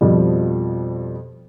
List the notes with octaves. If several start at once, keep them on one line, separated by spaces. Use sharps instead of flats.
F2 B2 F3 G3